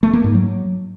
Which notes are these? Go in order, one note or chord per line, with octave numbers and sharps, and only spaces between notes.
A3
A#3
G#2
F#3